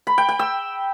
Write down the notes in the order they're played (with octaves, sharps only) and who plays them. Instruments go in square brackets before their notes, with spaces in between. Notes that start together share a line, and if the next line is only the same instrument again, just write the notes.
[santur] B5
G5
G5
E6